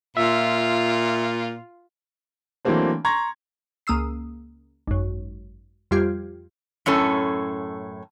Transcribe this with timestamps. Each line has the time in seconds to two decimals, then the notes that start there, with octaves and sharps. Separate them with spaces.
0.17 A#2 F4 E5
2.65 E3 F#3 A3 A#3 C4 D4
3.05 A#5 C6 C#6 G#6 A#6
3.87 C#2 A#3 D#6 E6 C7
4.87 G#1 F#2
5.91 F2 G3 F4 G4 G#6
6.86 F#2 A2 C#4 A4